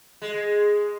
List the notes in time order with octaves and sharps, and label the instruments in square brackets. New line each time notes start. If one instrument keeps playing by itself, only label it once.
[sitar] G#3